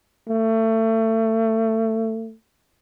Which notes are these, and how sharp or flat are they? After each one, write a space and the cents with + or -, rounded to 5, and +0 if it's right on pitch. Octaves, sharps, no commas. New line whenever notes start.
A3 +25